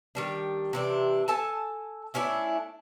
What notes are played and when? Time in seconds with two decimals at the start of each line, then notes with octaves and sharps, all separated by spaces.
0.15 D#3 G3 D4
0.73 C3 E3 D4
1.28 A4 G#5 A5
2.14 A3 C#4 D4 E4